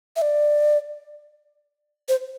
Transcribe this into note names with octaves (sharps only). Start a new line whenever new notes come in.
E5
D5
C5